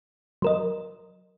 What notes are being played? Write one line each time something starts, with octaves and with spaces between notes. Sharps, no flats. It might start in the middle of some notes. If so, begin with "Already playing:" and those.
F#3 A#4 D#5